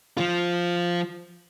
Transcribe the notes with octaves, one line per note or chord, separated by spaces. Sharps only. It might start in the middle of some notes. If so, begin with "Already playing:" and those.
F3 F4